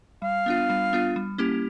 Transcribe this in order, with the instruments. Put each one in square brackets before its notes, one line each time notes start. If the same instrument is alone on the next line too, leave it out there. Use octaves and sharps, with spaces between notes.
[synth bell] G3 [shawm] F5
[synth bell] B3 D4 F4
G3
B3 D4 F4
G3
A#3 C#4 E4 G4